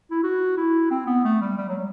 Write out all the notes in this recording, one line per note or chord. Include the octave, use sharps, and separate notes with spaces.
E4
F#4
E4
C4
B3
A3
G3
G3
F#3